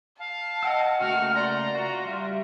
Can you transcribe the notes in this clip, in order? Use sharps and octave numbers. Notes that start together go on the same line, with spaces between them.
F5 A5
D#5 F#5 G5 E6
C#3 A3 A#3 F#4 F6
D5 A#5 C6
F4 F#4
G3 E5